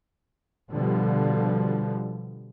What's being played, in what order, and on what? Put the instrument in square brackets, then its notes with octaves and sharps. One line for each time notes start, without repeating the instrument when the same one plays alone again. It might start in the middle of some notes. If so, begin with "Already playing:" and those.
[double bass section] B2 D3 F3 G3